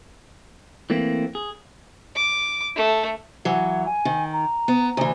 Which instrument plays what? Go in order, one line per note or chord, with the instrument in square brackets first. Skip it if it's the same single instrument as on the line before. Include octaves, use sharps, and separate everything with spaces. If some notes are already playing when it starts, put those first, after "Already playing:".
[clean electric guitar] E3 A3 A#3 C4
G#4
[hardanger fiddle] D6
A3
[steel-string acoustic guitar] E3 F#3 [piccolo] F#5
[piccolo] G#5
[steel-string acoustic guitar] D#3
[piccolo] A#5
[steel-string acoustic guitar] B3
D2 E3